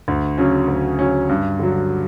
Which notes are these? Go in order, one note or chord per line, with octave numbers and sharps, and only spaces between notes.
D2
C#3 F#3 C#4
D2
C#3 F#3 C#4
G2
D3 F#3